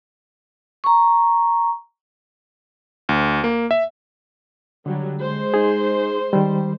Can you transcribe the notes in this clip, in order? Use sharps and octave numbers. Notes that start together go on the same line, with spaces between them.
A#5 C#6
D2
A#3
E5
D3 F#3 G3
G#3 C5
D#4 G#4
D#3 G3